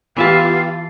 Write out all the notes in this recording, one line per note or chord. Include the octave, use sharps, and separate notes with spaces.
E3 B3 F4 G4 E5 A5